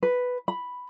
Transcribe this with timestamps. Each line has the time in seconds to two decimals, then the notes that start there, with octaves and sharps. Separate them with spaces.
0.03 B4
0.48 B5